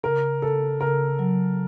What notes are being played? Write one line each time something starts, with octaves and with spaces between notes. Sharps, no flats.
C#3 A#4
C#3 A4
C#3 A#4
F#3